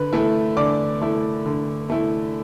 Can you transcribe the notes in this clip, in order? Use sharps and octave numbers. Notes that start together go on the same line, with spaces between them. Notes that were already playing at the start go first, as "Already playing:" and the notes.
Already playing: D3 B4
A3 E4
D3 D5 D6
A3 E4
D3
A3 E4